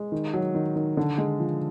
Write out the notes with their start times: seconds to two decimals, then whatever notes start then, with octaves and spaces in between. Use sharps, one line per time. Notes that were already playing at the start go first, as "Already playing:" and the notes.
Already playing: G#3
0.12 D#3
0.34 F#3
0.55 D#3
0.76 D#3
0.97 D3
1.18 G#3
1.39 F3